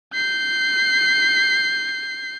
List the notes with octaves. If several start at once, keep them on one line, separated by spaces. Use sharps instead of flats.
G6 C7